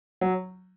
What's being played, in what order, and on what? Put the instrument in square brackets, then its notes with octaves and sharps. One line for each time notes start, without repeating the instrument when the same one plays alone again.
[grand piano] F#3